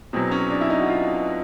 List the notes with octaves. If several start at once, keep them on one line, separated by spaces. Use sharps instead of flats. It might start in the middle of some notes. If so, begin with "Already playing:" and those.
E2 B2 F#3 C4
C#4
D4
E4
D#4
F#4
F4